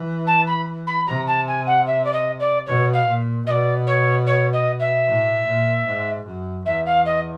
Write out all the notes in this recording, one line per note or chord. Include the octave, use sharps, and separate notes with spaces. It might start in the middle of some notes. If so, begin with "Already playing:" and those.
Already playing: E3
A5
B5
B5
C3 A#5
A5
G#5
F#5
E5
D5
D#5
D5
B2 C#5
F5
A#2
B2 D5 D#5
C#5
C#5
D#5
E5
A2
A#2
G#2
F#2
E2 E5
F5
D#5